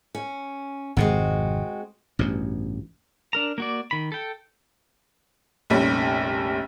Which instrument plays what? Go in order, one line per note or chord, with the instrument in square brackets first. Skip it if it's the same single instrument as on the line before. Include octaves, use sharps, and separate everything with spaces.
[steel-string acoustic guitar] C#4
[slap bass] G#1 F2 C3 [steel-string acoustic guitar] G#3 C4 F#4
[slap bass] A1 G2 B2
[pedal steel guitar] D4 A#4 A#5
A#3 F#4 D5
D#3 B5
A4 G5
[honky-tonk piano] F1 A#1 G3 C#4